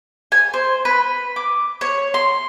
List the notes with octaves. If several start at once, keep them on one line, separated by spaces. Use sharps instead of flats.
G#5
C5
B4
D6
C#5
C6